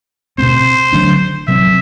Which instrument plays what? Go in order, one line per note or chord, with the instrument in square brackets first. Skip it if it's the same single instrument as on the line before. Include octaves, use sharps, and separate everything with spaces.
[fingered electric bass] B2 A3 C4 [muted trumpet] C5
[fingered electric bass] D3 F#3 A3 D4
[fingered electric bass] C3 F#3 C4 [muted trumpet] E5